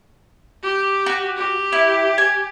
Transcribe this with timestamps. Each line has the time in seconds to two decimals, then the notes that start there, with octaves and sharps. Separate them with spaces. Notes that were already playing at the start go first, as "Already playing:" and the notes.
0.63 G4
1.06 F#4
1.37 G4
1.72 E4
2.18 G#5